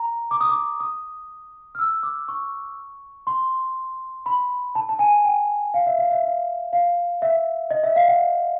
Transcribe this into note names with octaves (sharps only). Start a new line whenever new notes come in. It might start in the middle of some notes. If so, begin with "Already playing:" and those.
Already playing: A#5
D6
D#6
D6
D#6
F6
E6
D6
C#6
C6
B5
A5
A5
G#5
G5
F5
E5
F5
E5
F5
F5
E5
D#5
E5
F5
F#5